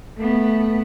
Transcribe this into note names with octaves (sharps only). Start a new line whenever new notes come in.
A3 B3